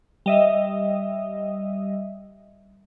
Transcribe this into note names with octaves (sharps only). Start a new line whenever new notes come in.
G3 D#5 E5